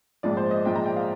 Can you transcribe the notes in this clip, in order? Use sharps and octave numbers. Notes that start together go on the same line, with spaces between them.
A#1 G#2 F3 G#3 D5
C5
D#5
A#1 G#2 F3 G#3 G5
A#5
G5
F5